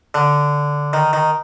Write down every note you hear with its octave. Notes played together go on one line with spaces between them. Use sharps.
D3
D#3
D#3